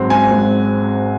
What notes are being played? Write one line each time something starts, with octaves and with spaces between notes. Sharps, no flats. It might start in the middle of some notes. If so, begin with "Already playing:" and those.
Already playing: G#1 G#2 F#3 C4
G#2 G#5
G#1